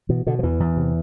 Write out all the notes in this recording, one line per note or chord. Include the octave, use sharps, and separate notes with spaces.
B2 E3
B2 D3
F3
E2 E3
E2
C3